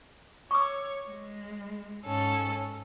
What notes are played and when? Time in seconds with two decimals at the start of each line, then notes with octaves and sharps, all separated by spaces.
0.51 C#5 C#6 D6 E6
1.11 G#3
2.06 G#2 C#4 A4